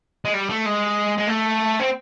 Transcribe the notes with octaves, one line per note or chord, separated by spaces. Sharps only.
G#3
G3
A3
G#3
G#3
A3
C4